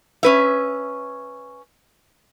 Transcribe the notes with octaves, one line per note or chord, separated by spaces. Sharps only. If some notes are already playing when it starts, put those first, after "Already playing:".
C#4 B4 E5